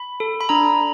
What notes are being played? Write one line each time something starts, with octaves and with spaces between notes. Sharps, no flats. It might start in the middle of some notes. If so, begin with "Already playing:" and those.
Already playing: B5
A4
B5
D4 A#5